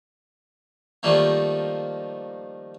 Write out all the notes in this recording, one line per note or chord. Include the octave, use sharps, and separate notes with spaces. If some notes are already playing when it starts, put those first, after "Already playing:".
D#3 F3 G3 A3 A#3